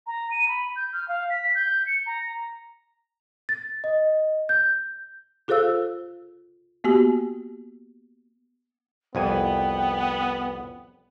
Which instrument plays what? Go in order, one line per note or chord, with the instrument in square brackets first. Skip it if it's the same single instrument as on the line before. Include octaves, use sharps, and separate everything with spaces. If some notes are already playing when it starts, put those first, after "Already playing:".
[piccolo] A#5
D#7
B5
G6
F6
F5
B6
G6
C#7
A#5
[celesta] A6
D#5
G6
[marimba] F4 G#4 A4 C5 F5 E6
A#3 B3 F#4 G4
[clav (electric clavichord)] C2 F2 G#5 [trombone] B3 [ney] G5